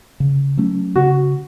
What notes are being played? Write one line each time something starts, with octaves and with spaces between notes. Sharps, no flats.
C#3
F#3 A3 C#4
C#3 F#4